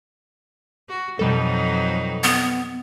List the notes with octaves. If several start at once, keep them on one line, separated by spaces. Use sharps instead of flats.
F#4
F2 B2 F#3 G3 D#4 A4
B3